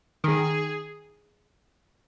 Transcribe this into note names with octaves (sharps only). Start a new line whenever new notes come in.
D#3 G#4